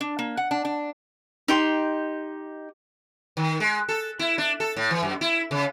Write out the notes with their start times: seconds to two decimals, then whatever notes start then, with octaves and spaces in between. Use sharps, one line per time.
0.01 D4
0.19 A#3
0.37 F#5
0.51 D4
0.65 D4
1.48 D#4 G4 C6
3.37 D#3
3.60 G#3
3.89 A4
4.19 E4
4.38 D4
4.60 A4
4.77 A2
4.91 E3
5.03 F#2
5.21 E4
5.51 C#3